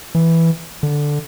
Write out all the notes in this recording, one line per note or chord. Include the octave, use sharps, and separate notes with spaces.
E3
D3